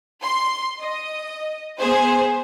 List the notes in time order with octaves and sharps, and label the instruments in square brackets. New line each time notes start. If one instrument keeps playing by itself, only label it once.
[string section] C6
D#5
B3 G#4 C5